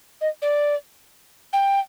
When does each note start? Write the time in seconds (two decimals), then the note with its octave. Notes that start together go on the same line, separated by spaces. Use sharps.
0.21 D#5
0.42 D5
1.53 G5